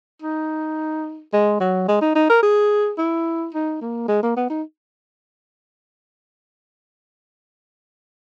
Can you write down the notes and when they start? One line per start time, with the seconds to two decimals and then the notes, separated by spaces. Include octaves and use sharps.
0.22 D#4
1.33 G#3
1.60 F#3
1.88 G#3
2.01 D#4
2.15 D#4
2.30 A#4
2.42 G#4
2.98 E4
3.54 D#4
3.81 A#3
4.08 G#3
4.23 A#3
4.36 B3
4.50 D#4